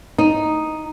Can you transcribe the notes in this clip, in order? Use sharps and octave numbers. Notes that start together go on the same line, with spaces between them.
D#4